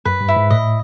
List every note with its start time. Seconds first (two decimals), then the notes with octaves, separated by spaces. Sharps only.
0.05 F#2 B4
0.21 G2
0.28 E4
0.36 G#2
0.50 A2 D#5